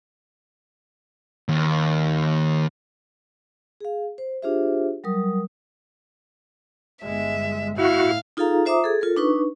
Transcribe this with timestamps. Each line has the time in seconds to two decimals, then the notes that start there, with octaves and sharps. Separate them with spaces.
1.49 D#2
3.81 G#4 F5
4.18 C5
4.42 D4 F4 G4 G#4 C5 E5
5.04 F#3 G3 A#4 D#6
7.04 G1 G#3 E5
7.78 A2 E4 F#4 F5
8.37 D#4 F4 G#4 A4 F5 A#5
8.65 F4 C5 E5 A#5 D6 D#6
8.84 G#4 A4
9.01 F4 A4 A#4
9.17 D4 D#4 B4 C#6